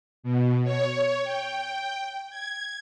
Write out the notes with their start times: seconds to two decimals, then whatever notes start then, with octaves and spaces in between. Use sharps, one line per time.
0.23 B2
0.64 C#5
1.24 G5
2.30 G#6